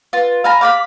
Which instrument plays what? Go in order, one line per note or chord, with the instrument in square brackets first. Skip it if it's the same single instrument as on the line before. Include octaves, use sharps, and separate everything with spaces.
[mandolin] F4 [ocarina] B4
[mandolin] F5 G#5 A#5 [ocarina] B5
[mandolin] F5 G5 B5 [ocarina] D6